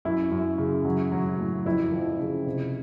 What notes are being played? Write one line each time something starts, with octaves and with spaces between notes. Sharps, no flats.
F#2 E4
F#2
C#3
F#3
F#3
A2
F2 E4
F3
C#3
C3